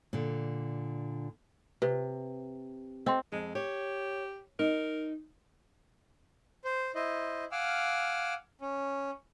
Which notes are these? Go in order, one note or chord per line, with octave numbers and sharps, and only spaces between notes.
A#2 D3
C3 B4
C4 D#5 G5 C6
F2 G#3
G4 C#5
D#4 A#4
C5
E4 C5 D#5
F5 F#5 G#5 D6 E6 F6
C#4